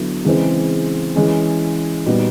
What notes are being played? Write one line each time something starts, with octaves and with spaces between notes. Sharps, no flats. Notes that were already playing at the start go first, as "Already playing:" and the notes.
Already playing: D3 F#3 B3 E4
C#3 E3 G#3 C4
E3 G#3 C#4
A#2 G3 B3 D#4 F#4